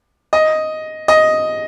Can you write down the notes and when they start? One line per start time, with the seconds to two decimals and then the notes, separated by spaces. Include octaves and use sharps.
0.33 D#5
1.08 D#5